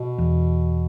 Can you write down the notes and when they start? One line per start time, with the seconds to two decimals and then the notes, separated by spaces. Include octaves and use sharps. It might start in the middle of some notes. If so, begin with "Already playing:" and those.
Already playing: B2
0.18 E2